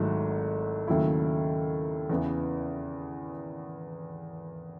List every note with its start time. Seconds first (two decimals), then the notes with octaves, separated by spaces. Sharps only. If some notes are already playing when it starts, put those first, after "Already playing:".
Already playing: G#1 G#2 F#3 A3 E4
0.88 D#2 C#3 F#3 A3 E4
2.09 E2 C#3 E3 B3 E4